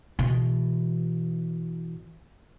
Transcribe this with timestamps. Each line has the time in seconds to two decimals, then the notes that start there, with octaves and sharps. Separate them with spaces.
0.19 B2 E3